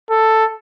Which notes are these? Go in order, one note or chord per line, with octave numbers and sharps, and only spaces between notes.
A4